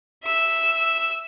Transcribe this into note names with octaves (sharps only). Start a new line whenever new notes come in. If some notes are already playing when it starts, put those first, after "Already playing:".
E5 E6